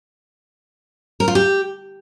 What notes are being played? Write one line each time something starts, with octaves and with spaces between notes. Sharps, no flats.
A#4
F4
G4